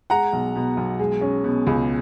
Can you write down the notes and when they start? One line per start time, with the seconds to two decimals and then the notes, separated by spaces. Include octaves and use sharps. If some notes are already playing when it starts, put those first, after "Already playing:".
0.10 G#3 F#5 A#5
0.33 B1
0.56 B2
0.77 B1
0.99 G#3
1.21 C#4
1.44 B2
1.67 C#2